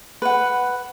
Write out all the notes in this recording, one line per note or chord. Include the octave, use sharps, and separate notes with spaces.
B4 F#5